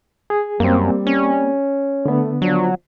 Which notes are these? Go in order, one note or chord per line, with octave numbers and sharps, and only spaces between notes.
G#4
F#2 G3 A#3 C4
C#4
D3 A3 B3
F3 F#3 D4